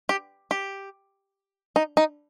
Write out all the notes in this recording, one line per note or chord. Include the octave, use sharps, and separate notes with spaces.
G4
G4
D#4
D#4